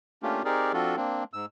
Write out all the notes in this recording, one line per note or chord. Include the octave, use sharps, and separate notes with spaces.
A3 A#3 C#4 D4 F4 G4
C4 D#4 G4 G#4 A#4 D5
F3 C4 D4 F4 F#4 A4
A#3 C4 D4
G#2 E6